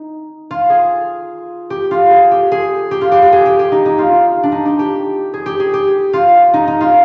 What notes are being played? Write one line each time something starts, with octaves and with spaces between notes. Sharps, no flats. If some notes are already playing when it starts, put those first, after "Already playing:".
Already playing: D#4
F4
G#4
G4
F4
G#4
G4
G#4
G4
F4
G4
G4
G#4
G4
G4
D#4
D#4
F4
F4
D4
D#4
G4
G4
G#4
G4
G#4
G4
F4
D#4
D#4
F4